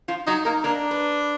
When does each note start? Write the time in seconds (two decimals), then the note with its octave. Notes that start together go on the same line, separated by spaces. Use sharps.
0.08 F3 F4
0.27 F#3 D#4 F#4
0.45 A#3 D#4 A#4
0.64 A#3 D4 A#4
0.91 B4